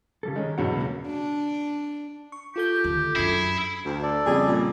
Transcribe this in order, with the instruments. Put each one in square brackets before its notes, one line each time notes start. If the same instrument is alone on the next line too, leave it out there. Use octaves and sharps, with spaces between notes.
[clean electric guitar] C#3 G3 A4
[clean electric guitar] D#3 [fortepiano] G#3 C#4
[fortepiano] E2 B2 F#3 [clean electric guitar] G2 F#5
[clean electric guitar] C#3 A#3
[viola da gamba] D4
[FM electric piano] C#6
[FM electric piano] F4 A4 G6 [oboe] G4
[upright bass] D2 D#3
[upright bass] F#2 D4 [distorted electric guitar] E4 [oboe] G#4
[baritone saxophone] D2
[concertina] A4 D5
[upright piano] F2 C#3 G3 [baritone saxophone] G#4
[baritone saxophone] A#2